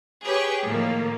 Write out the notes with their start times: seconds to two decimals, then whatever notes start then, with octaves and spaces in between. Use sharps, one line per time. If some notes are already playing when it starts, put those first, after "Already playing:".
0.24 G4 G#4 B4 C#5
0.64 A2 D#3 F3 A#3